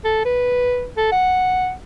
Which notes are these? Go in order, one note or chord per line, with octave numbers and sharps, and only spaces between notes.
A4
B4
A4
F#5